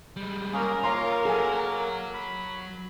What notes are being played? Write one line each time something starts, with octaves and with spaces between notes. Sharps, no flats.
G3 G#3
A#3 C#4 G#4 A#4
A#3 F4 C#5 A#5 C6
F#3 F#4 G#4 A4 G#5
B5